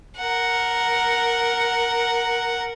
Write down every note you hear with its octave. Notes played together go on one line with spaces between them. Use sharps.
A#4 F#5